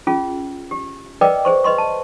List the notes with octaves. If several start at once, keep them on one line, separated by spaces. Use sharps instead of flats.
C#4 F4 G#4
G4
A#4 B4 D5 D#5 G5 D6
G#4 C5 C#6
B4 D#5 C6 C#6
A5